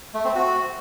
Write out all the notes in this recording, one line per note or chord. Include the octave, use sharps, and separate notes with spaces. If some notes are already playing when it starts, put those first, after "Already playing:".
A3
C4
F#4